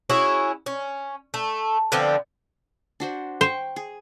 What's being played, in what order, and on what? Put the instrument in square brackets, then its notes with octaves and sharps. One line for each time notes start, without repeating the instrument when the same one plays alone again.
[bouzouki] C#4 E4 F#4 G#4
C#4
A3
D3 F3 B3 C4
[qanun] D4 F#4 C5
[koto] C5 [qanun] G5 C#6
[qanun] G#4